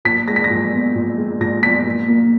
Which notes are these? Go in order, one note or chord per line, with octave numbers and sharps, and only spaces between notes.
A#2 B6
G#3 A#6
B6
A#6
A#2
B3
A#2
G#3
A#2 A#6
B3 B6
A#2
A#3